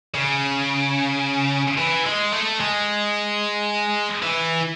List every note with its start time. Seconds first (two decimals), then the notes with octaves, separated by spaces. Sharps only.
0.14 C#3
1.78 E3
2.06 G#3
2.32 A3
2.60 G#3
4.23 E3